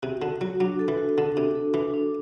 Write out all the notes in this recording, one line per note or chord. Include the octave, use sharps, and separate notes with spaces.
C3 F#4
D3 F#4
F#3 F#4
F#3 D4
A4
E3
F#4
D3 A4
C3 D4
A4
E3 D4
D4